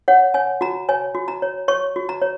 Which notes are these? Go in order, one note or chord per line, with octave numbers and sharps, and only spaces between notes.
C#5 F#5
C#5 G#5
F#4 A#5
C#5 G#5
F#4
A#5
C#5
C#5 C#6
F#4
A#5
C#5